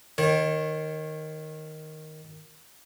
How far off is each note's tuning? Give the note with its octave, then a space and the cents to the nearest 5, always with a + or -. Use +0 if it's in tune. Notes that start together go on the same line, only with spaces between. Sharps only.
D#3 +0 C#5 -35